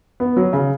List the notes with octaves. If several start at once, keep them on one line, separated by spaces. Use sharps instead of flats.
B3
F#3
C#3